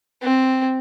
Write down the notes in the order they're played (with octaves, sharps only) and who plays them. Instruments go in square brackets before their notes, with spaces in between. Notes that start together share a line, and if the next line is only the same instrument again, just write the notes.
[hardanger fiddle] C4